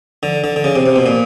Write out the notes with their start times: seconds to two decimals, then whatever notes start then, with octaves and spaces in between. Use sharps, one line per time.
0.23 D3
0.44 D3
0.56 D3
0.64 C#3
0.76 C3
0.86 C3
0.96 B2
1.06 A#2